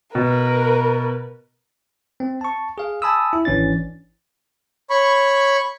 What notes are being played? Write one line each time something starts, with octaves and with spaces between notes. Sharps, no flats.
B2 A#4 B4
C4
A5 C#6
G#4 F5
G#5 A5 B5 D#6 E6
E4
G#1 E3 C#4 D4 D5 A6
C#5 B5 C#6